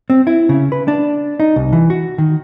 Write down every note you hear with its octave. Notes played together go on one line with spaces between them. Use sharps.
C4
E4
C#3
B4
D4
D#4
C2
E3
F#4
D#3